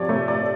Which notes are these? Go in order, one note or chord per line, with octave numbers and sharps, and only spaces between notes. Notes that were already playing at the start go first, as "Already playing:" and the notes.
Already playing: C3 F3 C#5 D5
A3
D5